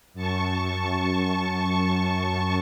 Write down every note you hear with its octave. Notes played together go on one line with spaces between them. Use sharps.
F#2 A5 C#6